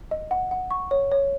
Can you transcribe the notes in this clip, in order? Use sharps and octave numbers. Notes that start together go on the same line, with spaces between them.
D#5
F#5
F#5
C#6
C#5
C#5